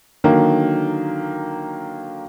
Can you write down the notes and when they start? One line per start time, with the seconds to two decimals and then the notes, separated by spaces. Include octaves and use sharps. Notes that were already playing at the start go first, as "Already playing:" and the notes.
0.24 D3 D#3 F#3 A#3